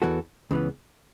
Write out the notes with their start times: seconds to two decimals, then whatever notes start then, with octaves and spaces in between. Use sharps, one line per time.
0.02 E2 E3 B3 F#4 A4
0.51 C#2 C#3 E3 B3